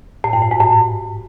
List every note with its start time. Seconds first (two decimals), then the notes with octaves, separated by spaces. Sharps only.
0.24 A2
0.33 G2
0.42 A2
0.51 G#2
0.60 A2